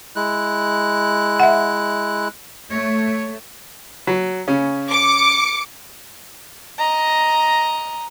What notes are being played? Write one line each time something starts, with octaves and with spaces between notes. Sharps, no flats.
G#3 E4 F#6
E5 F#5
A3 C#5
F#3
C#3 C#4
D6 C#7
D#5 A#5